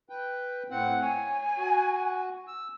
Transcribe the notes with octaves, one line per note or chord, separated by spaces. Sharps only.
B4 G5
A2 C4 F#5
C#5 G#5
F#4
E6